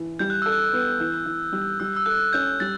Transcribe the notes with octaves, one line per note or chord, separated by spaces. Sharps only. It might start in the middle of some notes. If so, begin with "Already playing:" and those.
Already playing: E3
G3 G6
F#6
A4 E6
F#6
B3
E3
E3
G3
G3 E6
E6
A4 F#6
C#4 G6
G3 A6